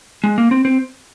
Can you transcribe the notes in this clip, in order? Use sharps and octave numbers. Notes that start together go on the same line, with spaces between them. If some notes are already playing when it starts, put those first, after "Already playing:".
G#3
A#3
C4
C4